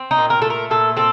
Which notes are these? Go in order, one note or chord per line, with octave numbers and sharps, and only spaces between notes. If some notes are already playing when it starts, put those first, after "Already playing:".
Already playing: C4
D#4
A#2
A#4
A3 A4
A#4
A#2 A4
C4 A4